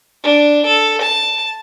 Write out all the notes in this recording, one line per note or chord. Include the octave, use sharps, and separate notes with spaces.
D4
A4
A5